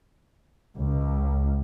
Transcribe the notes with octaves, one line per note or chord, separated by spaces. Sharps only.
C#2